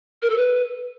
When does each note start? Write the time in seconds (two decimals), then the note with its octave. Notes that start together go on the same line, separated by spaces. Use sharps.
0.22 A#4
0.30 A4
0.37 B4